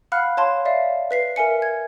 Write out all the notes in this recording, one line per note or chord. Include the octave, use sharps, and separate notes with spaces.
F5 F#5 B5 F6 F#6
C#5 F5 A5 C6
D5 E5 F5
B4 B6 C7
A#4 E5 G#5 C#7
G#6